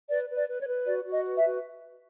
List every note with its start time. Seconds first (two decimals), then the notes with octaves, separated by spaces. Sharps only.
0.10 B4 D5
0.30 B4
0.35 D5
0.49 B4
0.61 C#5
0.67 B4
0.85 F#4 D5
1.05 F#4
1.11 D#5
1.24 B4
1.36 E5
1.44 F#4